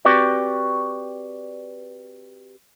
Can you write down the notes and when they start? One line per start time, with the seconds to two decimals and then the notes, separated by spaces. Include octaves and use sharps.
0.05 C4 F#4 G4 B4 D5